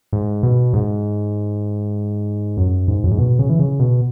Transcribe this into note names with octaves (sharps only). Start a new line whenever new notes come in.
G#2
B2
G#2
F#2
G#2
F#2
G#2
B2
C#3
E3
C#3
B2